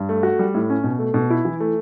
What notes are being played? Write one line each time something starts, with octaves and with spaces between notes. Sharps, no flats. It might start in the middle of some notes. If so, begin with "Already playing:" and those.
Already playing: G2
A3
F#4
G3
A2
C#4
B2
A3
B2
E4
E3
A3